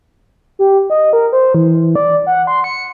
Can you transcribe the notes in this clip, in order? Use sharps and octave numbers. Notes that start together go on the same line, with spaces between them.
G4
D#5
A#4
C5
E3
D5
F#5
C6
C#7